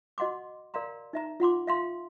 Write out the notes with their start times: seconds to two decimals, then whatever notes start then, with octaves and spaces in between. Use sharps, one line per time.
0.18 F#4 D#5 F#5 C6 D6
0.74 A#4 D5 F5 A#5 C6
1.13 D#4 E5 A#5
1.40 F4 F#5 C6 D6
1.67 E5 F5 C6